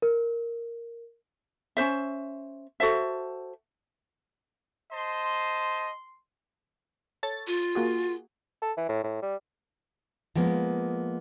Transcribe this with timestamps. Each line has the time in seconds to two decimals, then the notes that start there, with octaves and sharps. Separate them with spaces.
0.02 A#4
1.77 C#4 D#4 C5 E5
2.80 F#4 A4 C5 E5
4.92 C5 D#5 A5 C6
7.23 A4 C#5 A6
7.47 F4
7.75 A#3 F#4 G#4
8.62 A4
8.77 E3
8.89 A2
9.04 A2
9.22 G3
10.36 F3 G#3 A#3 B3